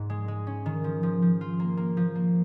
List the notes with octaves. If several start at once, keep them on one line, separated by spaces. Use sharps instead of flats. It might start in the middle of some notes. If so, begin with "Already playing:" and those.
Already playing: G#2
G#3
G#3
C#4
D#3
F3
F3
F3
F4
A#3
A#3
F3
A#3